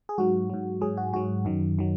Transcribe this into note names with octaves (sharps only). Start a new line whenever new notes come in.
G#4
G#2 F#3 F#4
G#2 F#3
G#2 F#3 G#4
F#4
G#2 F#3 F#4
F#2 D#3 F#3
D#3 F#3